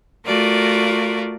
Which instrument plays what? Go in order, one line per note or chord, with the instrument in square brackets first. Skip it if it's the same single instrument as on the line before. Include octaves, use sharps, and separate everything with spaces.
[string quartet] A3 F4 F#4 A#4 D5